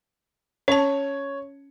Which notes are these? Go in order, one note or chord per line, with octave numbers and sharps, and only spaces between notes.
C#4 C#5 A5